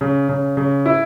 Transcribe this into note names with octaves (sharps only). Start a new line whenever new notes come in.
C#3
C#3
C#3
E4